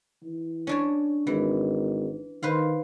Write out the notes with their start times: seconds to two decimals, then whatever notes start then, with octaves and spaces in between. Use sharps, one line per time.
0.23 E3
0.67 C#4 D4 C#5
1.27 G#1 E3
2.43 D#3 B4 C5 F5